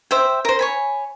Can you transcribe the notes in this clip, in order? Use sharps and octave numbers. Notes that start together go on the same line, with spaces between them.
C5 E5 G5
A#4 C5
C#5 G#5 B5